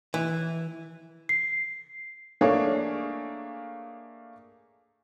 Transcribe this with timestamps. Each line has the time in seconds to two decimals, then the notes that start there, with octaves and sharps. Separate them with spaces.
0.14 E3
1.29 C7
2.41 A3 A#3 D4 G#4 C#5